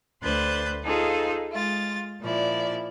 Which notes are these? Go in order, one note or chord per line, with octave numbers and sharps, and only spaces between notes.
D2 B4 C5 F#6 G6 A6
D#4 F4 G#4 A4 C5 F5
G#3 F4 A6
A#2 F3 E4 D5